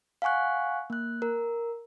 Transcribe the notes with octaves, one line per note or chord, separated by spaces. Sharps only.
F5 F#5 G#5 C#6 F#6
A#3 F#6
A#4